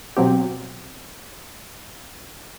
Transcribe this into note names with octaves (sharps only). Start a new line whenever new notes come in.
B2 F#3 C4 G4